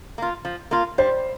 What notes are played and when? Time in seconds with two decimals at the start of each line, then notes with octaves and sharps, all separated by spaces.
0.18 A#3 F4
0.45 F3
0.71 A#3 F4
0.98 G3 C5